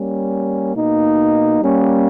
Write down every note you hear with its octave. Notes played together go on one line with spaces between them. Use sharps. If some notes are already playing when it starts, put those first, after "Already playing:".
Already playing: G3 A#3 C#4
B2 A#3 D#4
G3 A#3 C#4